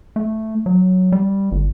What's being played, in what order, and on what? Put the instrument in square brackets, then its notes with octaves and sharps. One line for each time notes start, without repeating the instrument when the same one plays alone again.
[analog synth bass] A3
F#3
G3
G1